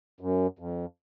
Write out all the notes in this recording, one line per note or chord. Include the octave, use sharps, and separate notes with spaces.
F#2
F2